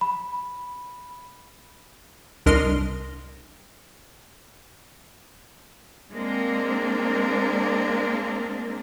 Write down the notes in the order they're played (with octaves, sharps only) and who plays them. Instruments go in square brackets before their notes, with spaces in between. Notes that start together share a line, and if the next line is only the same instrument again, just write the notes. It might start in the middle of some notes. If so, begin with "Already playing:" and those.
[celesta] B5
[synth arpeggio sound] C2 D4 A#4 D#5 C6 F6
[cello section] G#3 A#3 C4 D4 A#4